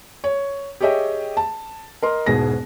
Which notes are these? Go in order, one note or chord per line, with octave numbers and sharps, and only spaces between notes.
C#5
G4 G#4 C#5 D#5 E5 G5
A5
A#4 D#5 C6
E1 G#2 B2 G#4 A#6